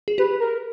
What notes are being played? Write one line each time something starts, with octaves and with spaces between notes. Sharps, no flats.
G#4
G4 B4
A#4